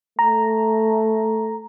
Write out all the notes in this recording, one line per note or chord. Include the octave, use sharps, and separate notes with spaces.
A3 A#5